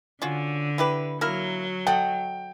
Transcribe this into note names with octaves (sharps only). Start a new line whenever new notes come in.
D3 C#4 F4 F#4
E4 G4 B4
F#3 A#3 E4 A#4
A4 D#5 F#5 G5